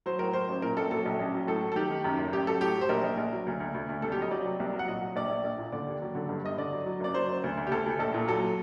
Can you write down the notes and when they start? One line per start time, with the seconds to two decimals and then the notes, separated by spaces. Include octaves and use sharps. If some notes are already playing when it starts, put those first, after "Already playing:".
0.06 F#3 C5
0.19 A2 A#4
0.33 F#3 C5
0.48 A1
0.62 A#2 A#4
0.77 A#1 A4
0.91 F#3 A4
1.06 A#1
1.19 A1
1.34 F#3
1.47 A2 A4
1.63 F#3
1.72 A4
1.76 D#3 G4
1.91 D#3
2.04 F#2
2.18 F#1
2.32 A1 G4
2.47 F#3 A4
2.61 A2 G4
2.76 F#3
2.81 C5
2.89 A#1 A#4
3.04 A#1
3.18 A#1
3.33 F#3
3.47 D2
3.60 D2
3.74 D2
3.89 D2
4.02 C2 A4
4.12 G4
4.17 F#3
4.22 D#5
4.31 F#3 D5
4.45 C3
4.60 C2
4.73 F#3
4.79 F#5
4.88 A#2 D#5
5.02 F#3
5.16 A#1 D5
5.30 A#1
5.44 A#1
5.59 A#2
5.72 D3 D5
5.87 D#2
6.02 F#3
6.15 D3
6.29 G2
6.44 G1 D#5
6.58 D3 D5
6.72 F#3
6.86 F#3
7.00 F#1 D5
7.14 F#3 C5
7.28 F#1
7.44 D2
7.57 D2
7.67 G4
7.71 D2 A4
7.86 D2
7.99 A#1 A4
8.14 A#2
8.28 F#3 A4